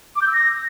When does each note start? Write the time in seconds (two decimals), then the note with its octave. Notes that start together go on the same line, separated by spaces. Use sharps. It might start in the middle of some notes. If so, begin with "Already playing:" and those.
0.16 D6
0.22 G6
0.27 E6
0.33 A#6